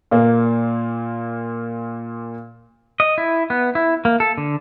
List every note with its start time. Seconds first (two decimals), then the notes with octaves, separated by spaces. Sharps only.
0.11 A#2 A#3
3.00 D#5
3.18 E4
3.50 B3
3.75 E4
4.05 A#3
4.20 A4
4.38 D3